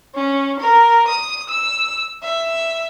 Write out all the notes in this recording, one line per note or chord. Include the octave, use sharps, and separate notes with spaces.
C#4
A#4
D#6
E6
E5